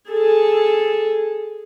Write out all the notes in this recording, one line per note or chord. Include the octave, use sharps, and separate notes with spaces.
G#4 A4